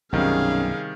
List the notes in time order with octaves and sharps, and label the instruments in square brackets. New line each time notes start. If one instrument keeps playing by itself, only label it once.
[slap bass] B1 F#2 [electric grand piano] C3 D#3 G3 [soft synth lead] C#4 [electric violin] G#4 F5